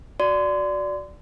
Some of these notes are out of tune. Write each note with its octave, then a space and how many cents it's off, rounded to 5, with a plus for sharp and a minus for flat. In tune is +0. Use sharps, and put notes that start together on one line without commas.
F#4 +0 D5 -5 C6 -30